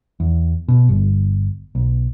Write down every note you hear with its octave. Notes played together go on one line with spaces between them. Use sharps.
E2
B2
G1
B1